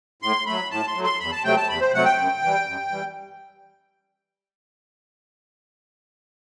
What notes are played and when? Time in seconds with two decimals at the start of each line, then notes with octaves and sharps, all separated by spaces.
0.22 A2 C6
0.46 F#3 A3 B5
0.71 A2 A5
0.87 C6
0.95 F#3 A3
1.04 C6
1.20 E2 B5
1.32 A5
1.44 C3 F#3 A3 G5
1.57 A5
1.69 E2 B5
1.81 C5
1.93 C3 F#3 A3 F#5
2.05 G5
2.18 F#2
2.43 E3 G3
2.67 F#2
2.91 E3 G3